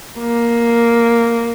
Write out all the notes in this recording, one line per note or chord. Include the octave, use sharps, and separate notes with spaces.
A#3